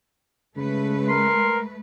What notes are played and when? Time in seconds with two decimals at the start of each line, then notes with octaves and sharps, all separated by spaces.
0.57 C#3 G#3 A3 B4
1.09 A#4 C6